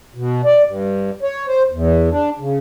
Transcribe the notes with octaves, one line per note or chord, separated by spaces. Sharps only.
B2
D5
G2
C#5
C5
E2
D4
C#3